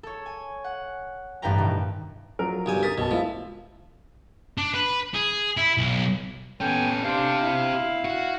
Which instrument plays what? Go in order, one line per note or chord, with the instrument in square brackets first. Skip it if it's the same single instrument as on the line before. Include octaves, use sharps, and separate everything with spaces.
[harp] A4 C#5
G#5
F#5
A1 G2 A4 B4 G5 A#5
B2 D#3
[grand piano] F3 F#3 A#4
[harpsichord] B1 G2 G#5
[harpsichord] A#4 [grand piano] D#6 A6 B6
[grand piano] B1 A5 [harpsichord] B2
[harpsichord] F3 [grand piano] G#3 E4
[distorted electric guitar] D4
B4
G#4
E4
B1
[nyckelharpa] B3 G#5 [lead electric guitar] C#4 A4 [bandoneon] G5
[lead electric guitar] C4 G4 [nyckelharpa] D4 C5 [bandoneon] F5
[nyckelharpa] E4
[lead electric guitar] F#4